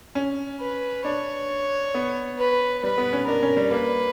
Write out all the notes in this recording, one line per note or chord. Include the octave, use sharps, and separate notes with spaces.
C#4
B4
D4 C#5
B3
B4
G3 B4
B3
C#4
D4 A#4
C#4
G3
A#3 B4